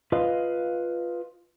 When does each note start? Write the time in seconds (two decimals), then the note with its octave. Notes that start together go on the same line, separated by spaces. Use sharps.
0.12 F4 B4 D#5 F5